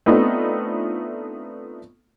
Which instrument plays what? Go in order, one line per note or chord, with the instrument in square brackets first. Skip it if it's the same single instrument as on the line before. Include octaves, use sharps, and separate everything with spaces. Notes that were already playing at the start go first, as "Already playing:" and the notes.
[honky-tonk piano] A3 B3 C4 D4 D#4 F4